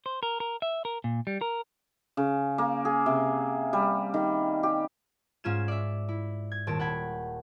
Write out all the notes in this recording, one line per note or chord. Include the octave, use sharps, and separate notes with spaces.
C5
A#4
A#4
E5
A#4
A#2
G3
A#4
C#3
A#3
G#4
C3
G3
D#3
G4
G#2 C#4 F4 G#6 E7
D5 E5
E4
G#6
D#1 C4 C#5 A5 D7
F#5 G5 B5 G#6